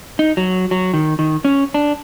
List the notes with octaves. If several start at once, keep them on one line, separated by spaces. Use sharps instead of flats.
D#4
F#3
F#3
D#3
D#3
C#4
D4